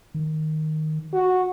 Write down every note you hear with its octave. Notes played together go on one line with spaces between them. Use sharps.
D#3
F#4